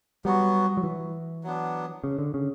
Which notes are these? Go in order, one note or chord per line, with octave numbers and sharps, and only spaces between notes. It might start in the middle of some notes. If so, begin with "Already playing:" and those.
F#3 G3 B3 F#4
F#3
E3
F#3 B3 D4
C#3
D3
C#3